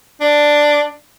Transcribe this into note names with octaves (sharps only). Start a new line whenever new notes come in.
D4